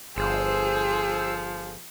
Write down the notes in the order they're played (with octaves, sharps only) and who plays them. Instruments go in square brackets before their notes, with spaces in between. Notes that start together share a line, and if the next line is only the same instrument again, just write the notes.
[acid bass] G1 [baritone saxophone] F3 [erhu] G#4 [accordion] C5 E6